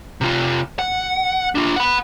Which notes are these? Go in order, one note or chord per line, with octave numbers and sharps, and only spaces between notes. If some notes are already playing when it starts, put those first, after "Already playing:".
C3 F4
F#5
D4 F4
F#5 B5